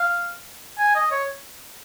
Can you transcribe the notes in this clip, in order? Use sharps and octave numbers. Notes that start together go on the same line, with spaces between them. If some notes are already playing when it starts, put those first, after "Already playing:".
Already playing: F5
G#5
D#5
C#5